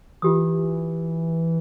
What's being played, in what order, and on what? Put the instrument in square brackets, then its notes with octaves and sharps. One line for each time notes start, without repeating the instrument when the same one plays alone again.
[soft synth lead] E3 [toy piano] F4 G4 D#6